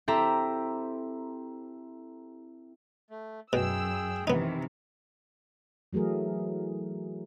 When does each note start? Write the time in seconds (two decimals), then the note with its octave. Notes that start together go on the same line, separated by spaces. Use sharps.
0.08 C4 E4 G4 A4 E5 A#5
3.10 A3
3.53 F#2 B2 G#4 G5 E6
4.27 C3 D#3 E3 B3 D#4
5.93 E3 F#3 A3 G#4 A#4